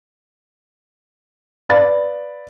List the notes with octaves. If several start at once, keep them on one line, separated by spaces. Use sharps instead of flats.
B4 D5 F5 B5 A6